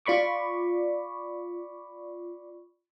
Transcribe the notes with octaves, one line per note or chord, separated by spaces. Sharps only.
F4 D5 B5 C#6 D6